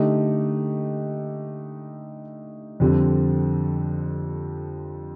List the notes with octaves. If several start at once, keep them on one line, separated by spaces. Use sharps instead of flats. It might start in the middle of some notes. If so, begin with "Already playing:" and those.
Already playing: D3 A3 D#4 G4
F2 D3 G3 C4